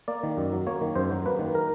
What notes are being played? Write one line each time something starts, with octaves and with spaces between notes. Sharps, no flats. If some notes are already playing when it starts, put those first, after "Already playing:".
A#3 D5
D#3
F#2
F#3
A#3 C#5
D#3
F#2 C5
F#3
A#3 B4
D#3
A#4